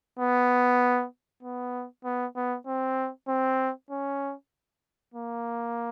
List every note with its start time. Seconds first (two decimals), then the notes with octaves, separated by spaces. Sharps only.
0.19 B3
1.43 B3
2.05 B3
2.36 B3
2.67 C4
3.28 C4
3.90 C#4
5.14 A#3